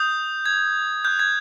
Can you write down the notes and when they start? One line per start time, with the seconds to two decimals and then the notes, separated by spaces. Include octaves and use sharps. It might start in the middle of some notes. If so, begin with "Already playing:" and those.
Already playing: D#6 G6
0.46 G#6
1.05 D#6 F#6 G6
1.19 G#6